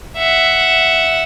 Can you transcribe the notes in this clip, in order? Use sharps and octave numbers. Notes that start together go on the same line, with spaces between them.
E5 F#5